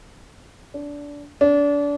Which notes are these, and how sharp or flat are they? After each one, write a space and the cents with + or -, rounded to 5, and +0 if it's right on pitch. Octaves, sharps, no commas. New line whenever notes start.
D4 -20
D4 -30